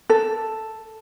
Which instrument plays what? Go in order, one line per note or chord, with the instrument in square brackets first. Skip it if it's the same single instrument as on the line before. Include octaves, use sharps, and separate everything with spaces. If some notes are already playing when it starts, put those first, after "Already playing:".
[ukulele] A4